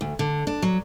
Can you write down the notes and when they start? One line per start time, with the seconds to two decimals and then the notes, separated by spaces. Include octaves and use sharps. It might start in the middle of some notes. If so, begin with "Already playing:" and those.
0.01 D2
0.19 D3
0.47 D4
0.62 F#3